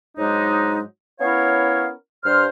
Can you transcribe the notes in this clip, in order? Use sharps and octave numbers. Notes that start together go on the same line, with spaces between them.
G#2 F#3 G#3 D4 D#4
B3 C#4 E4 A#4 C#5 F5
G2 C5 F6